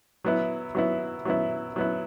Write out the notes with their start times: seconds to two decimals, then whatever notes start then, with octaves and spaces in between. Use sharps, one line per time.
0.24 F#3 B3 E4
0.75 F#3 B3 E4
1.25 F#3 B3 E4
1.76 F#3 B3 E4